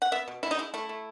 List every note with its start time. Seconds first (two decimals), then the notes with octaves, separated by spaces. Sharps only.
0.02 F#5
0.12 B3 E5
0.28 B2
0.43 B2 E4
0.51 D#4
0.58 G#3 E4
0.74 A3 E4
0.89 A3